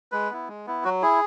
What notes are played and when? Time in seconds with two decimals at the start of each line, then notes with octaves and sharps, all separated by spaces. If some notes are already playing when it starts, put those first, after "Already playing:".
0.12 G#3 B4
0.30 B3 E4
0.48 G#3
0.66 B3 E4
0.84 F#3 F#4
1.02 E4 G#4